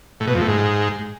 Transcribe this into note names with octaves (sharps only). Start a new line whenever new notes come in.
A2
B2
F2
A2
G#2